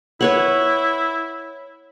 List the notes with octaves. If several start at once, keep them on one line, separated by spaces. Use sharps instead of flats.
E4 B4 C#5 F#5